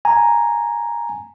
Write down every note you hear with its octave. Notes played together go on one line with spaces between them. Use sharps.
G#5 A#5